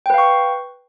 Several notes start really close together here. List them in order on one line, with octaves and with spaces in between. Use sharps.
G5 B4 F5 C#6